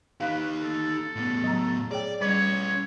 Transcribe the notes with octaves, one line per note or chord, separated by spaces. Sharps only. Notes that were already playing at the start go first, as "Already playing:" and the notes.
D#4 G4 B4 F5
A4
A2 B3
F#3 A#5
G#4 C#5 D5 G5
G3 C#4 B4 C#5